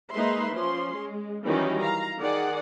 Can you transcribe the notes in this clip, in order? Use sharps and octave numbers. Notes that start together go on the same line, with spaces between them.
G#3 A#3 D#4 B4 E5 C6
F3 C#4 C6
G#3
D#3 E3 F#3 G3 C#4 D#4
F5 A#5
D#3 G#4 D5 F#5